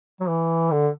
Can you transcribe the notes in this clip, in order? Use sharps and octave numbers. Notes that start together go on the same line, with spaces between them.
F#3
E3
D3